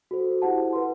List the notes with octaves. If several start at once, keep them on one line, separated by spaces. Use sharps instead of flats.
F#4 A4 C5
E4 G4 C5 F#5 A5
B4 F#5 C6